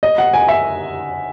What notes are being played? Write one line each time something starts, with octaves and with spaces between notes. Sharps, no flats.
D#5
F#5
G#5
E5